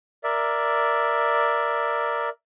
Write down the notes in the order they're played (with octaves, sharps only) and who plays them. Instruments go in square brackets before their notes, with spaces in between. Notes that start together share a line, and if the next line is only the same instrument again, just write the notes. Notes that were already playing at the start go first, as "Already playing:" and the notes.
[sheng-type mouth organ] A#4 D5 E5